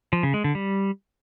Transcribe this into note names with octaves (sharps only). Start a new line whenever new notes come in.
F3
C#3
G#3
D3
G3